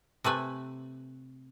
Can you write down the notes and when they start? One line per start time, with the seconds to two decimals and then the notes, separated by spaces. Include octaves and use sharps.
0.24 C3 A3 B4 G#5